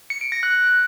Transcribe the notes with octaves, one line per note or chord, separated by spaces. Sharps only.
C#7
D7
A#6
F#6